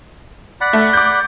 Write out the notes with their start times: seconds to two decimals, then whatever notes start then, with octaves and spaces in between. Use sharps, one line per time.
0.61 D5 F#5 B5
0.73 A3
0.93 D6 G6